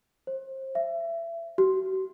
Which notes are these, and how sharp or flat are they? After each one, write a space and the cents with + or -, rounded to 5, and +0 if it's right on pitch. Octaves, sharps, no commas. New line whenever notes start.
C5 +30
E5 +25
F#4 +45